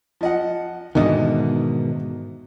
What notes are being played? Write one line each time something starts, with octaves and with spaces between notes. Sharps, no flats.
F3 D#5 F#5
E2 G#2 B2 D3 D#3 D#5